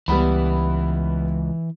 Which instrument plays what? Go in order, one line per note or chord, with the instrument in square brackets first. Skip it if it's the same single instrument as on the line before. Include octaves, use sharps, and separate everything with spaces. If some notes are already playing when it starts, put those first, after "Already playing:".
[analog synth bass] C#2 [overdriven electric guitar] E3 [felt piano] G3 B3 B5